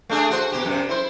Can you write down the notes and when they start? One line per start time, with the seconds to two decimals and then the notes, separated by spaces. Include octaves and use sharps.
0.09 A3 D4 G#4
0.30 F#4 C5
0.52 B2 G4
0.65 F#2 C3
0.89 E4 C5